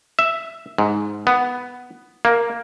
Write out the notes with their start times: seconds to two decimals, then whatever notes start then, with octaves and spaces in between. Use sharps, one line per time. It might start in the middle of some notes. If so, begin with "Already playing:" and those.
0.19 E5
0.78 G#2
1.27 B3
2.25 A#3